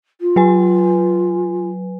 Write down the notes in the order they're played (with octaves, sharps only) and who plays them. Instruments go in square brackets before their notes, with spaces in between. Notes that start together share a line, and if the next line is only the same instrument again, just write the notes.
[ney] F4
[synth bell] F#3 B4 G#5